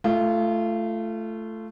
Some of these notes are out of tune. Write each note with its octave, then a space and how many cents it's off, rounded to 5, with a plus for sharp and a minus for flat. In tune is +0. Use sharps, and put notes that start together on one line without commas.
A3 +0 F4 -25